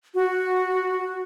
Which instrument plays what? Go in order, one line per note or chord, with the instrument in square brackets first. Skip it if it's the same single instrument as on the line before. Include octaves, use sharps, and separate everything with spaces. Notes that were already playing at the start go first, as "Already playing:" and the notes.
[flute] F#4